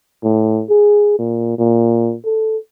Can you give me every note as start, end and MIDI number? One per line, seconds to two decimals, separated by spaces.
0.24 0.62 45
0.70 1.17 68
1.19 1.54 46
1.58 2.15 46
2.25 2.57 69